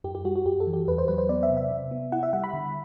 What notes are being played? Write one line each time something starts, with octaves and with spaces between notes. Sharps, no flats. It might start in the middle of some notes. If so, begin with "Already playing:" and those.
F#2 G4
G4
G3 F#4
F#4
F#2 G4
A4
E3
G4
E2 B4
C5
F#3 B4
C5
B3 D5
E5
C3
E5
C3
B3
E4 F#5
E5
G3 F#5
B5
D3